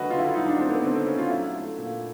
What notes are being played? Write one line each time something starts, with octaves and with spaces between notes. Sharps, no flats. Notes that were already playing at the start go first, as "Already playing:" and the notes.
Already playing: D3 F#3 A3 F#4 B4 D#5
D3 F4
E4
F4
F#3 D#4
D4
A3 C4
B3
D3 C4
C4
D3 C#4
F4
F#3 E4
A3
A#2